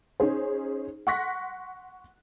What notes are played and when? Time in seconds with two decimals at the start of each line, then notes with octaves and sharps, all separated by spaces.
0.20 C#4 D#4 G#4 C5
1.07 F#5 C6 C#6 F#6 A#6 B6